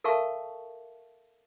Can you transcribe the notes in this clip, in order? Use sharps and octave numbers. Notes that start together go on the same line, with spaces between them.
A4 A#4 E5 F5 A5 C#6